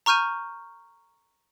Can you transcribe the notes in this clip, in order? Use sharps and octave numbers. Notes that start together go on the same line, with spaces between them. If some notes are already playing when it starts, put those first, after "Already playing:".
A#5 C#6 F6 G6 D#7